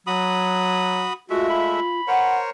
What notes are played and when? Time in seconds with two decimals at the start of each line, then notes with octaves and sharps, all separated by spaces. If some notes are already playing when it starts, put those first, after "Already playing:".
0.07 F#3 F#4 B5 D#6
1.30 G#3 A3 F4 F#4 E5
1.49 B5
2.08 A#4 C5 C#5 F#5